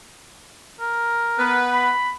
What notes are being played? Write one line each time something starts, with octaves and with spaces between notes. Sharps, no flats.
A#4
B3 B4
B5